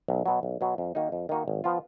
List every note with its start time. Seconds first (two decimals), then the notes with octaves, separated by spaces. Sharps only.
0.08 B1
0.26 B2 F#3
0.43 B1
0.61 B2 F#3
0.78 F2
0.95 D#3 A#3 D#4 F#4
1.12 F2
1.29 D#3 A#3 D#4 F#4
1.48 G#1
1.64 F3 B3 F4